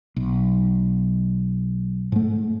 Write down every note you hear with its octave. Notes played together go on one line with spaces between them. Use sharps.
B1
G#2 A3